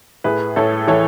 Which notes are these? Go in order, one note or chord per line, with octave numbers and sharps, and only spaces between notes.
A2 G#4 B4
A2 A4 C#5
E3 A4 C#5